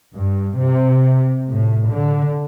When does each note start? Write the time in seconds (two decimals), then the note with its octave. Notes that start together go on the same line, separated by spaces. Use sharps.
0.16 G2
0.58 C3
1.52 A2
1.91 D3